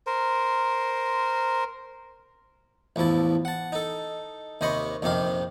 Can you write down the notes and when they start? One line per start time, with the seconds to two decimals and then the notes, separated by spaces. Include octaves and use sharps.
0.07 A#4 C5
2.96 A1 E2 F3 E4 A5
3.45 F#5 A5
3.72 D#4 A4
4.61 D#2 C3 C5 D#5 B5 C#6
5.02 A#1 F2 C3 D#3 G4 F5